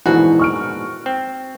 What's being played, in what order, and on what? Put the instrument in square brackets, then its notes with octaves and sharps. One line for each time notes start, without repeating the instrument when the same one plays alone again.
[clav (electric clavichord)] A#1 G#2 B2 [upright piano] E3 [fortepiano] F#4
[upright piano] C#6 F6 D7
[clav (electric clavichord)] C4